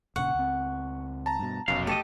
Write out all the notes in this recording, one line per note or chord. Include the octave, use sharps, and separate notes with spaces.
E1 A#2 C#3 F#5 C#6
C#2 C4
A5 A#5
G2 B2
F1 B1 F#2 F5
A3 G4 A4 D#5